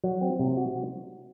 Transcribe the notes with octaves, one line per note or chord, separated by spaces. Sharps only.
F#3
C4
C3
F#4